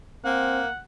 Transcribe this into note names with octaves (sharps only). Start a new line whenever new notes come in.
A#3 C4 F#5